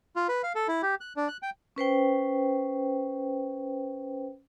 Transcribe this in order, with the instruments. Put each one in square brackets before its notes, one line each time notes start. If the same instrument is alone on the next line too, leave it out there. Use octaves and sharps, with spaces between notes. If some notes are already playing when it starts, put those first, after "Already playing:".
[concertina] F4
B4
F5
A4
E4
G4
F#6
D4
F#6
G5
[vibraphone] C#4 B4 C5 G5